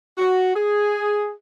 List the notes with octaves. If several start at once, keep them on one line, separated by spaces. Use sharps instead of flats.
F#4
G#4